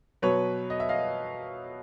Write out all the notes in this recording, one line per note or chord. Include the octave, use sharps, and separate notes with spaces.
B2 F#3 B4 C#5
D#5
E5
D#5 F5